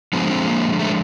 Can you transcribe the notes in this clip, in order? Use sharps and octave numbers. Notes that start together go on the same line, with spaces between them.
D3 F3 G#3 B3
C4
A#3
A3